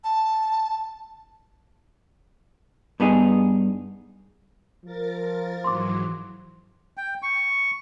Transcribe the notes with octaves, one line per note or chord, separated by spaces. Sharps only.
A5
G2 B3 D#4 G#4
F3 A#4 A6
G#2 E3 F#3 C6 D6
G5
C#6